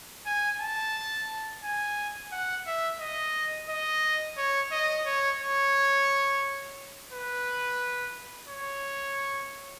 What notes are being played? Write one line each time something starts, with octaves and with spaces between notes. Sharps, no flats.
G#5
A5
G#5
F#5
E5
D#5
D#5
C#5
D#5
C#5
C#5
B4
C#5